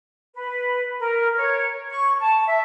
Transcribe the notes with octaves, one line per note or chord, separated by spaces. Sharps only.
B4
A#4
C#5
C#6
A5
E5